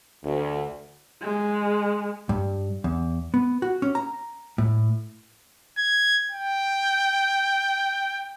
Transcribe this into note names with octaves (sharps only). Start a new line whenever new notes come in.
D2
G#3
G2
E2
B3
F#4
C#4
A#5
A2
G#6
G5